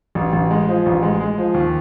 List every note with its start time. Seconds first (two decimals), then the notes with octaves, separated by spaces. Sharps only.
0.15 A1
0.33 A1
0.51 G#3
0.69 F3
0.86 A1
1.03 G#3
1.21 G#3
1.38 F3
1.54 D#2